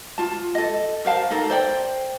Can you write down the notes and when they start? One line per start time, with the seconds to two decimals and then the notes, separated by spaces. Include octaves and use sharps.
0.18 F4 A5
0.55 A4 D#5
1.05 A#4 C5 F5 A5
1.30 D#4 A4 A#4
1.50 C5 D5 G5